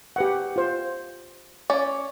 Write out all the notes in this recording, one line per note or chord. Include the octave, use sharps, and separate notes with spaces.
G4 B4 F#5
F4 C5
C#4 D5